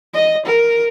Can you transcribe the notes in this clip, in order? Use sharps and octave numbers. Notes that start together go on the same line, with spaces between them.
D#5
A#4